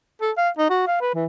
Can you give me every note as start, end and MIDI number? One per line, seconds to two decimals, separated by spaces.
0.21 0.32 69
0.37 0.50 77
0.58 0.69 63
0.70 0.87 66
0.87 0.96 77
1.01 1.13 71
1.15 1.26 52